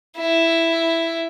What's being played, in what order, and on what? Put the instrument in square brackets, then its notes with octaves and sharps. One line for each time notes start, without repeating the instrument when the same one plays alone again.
[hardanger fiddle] E4